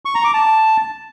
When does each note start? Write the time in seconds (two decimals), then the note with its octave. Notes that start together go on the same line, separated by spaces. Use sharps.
0.05 C#6
0.15 A#5
0.24 D6
0.34 A5